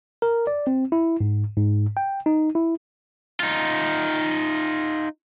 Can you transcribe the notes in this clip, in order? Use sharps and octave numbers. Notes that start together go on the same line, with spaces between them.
A#4
D5
C4
E4
G#2
G#2
G5
D#4
E4
D#4 F4